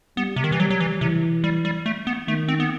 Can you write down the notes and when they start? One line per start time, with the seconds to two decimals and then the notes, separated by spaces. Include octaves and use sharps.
0.17 G3 B3
0.36 C3
0.44 D#3
0.52 E3
0.59 F#3 G3
0.70 F#3
0.80 E3
1.01 C3 E3
1.44 G3
1.65 G3
1.86 A3
2.07 B3
2.27 D#3 A3
2.48 C4
2.60 B3